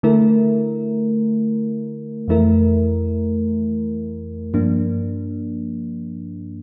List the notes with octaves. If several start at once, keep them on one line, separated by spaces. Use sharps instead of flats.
D3 A3 E4 A#4
F2 E3 A3 E4 A#4
G2 F3 A#3 D4